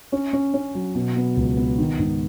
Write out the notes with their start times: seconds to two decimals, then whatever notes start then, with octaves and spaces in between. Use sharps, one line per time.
0.12 C#4
0.33 C#4
0.54 C#4
0.74 F#3
0.95 B2
1.16 B3
1.37 C#2
1.57 B3
1.78 D#3
1.99 G#2